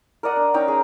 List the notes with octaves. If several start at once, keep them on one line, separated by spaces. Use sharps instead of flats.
A#4 D5 D#5 F#5
D4
C#4 D#4 G5 A#5
G#4